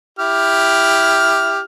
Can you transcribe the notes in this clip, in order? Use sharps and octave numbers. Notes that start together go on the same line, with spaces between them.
E4 G4 F6